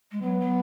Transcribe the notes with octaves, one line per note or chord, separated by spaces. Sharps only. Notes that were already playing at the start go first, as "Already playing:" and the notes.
G#3
F#3 B3
F#3